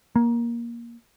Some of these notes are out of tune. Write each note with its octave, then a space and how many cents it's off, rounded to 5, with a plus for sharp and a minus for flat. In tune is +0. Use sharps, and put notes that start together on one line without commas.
A#3 +15